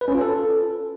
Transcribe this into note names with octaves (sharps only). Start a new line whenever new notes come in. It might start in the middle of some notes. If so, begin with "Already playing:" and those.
B4
C#4
F4
A4